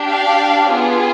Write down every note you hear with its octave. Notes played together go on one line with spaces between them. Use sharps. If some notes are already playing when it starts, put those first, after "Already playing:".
Already playing: D4 G4
D5 F5
B3 F4 G#4